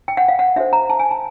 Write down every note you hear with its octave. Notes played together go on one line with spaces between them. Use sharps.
G5
F#5
F5
F#5
D4 F#4 A4 C5 E5
A#5
A5
G#5
A5